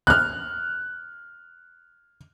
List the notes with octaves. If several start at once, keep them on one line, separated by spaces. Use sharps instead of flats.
F6 F#6